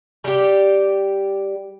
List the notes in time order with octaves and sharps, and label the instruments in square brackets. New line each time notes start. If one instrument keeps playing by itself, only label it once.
[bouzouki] G3 G4